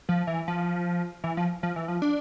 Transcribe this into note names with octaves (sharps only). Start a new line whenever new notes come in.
F3
E3
F3
E3
F3
F3
E3
F3
D4